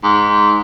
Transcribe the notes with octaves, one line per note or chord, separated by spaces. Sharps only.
G#2